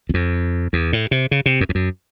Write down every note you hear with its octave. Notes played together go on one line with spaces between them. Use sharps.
E2
F2
E2
A2
C3
C#3
C3
F#2
F2
F#2